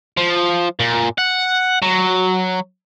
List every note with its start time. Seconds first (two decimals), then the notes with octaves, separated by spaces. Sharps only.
0.17 F3
0.80 A#2
1.18 F#5
1.82 F#3